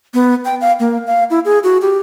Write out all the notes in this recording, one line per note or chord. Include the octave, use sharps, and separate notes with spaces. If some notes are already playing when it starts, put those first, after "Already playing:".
B3
G5
F5
A#3
F5
E4
G#4
F#4
G4